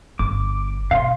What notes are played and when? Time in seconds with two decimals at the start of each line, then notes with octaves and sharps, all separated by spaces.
0.19 G1 D6
0.91 B2 F5 C6